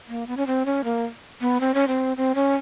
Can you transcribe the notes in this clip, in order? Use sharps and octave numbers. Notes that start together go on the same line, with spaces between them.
A#3
B3
C#4
C4
C#4
A#3
B3
C4
C#4
C4
C4
C#4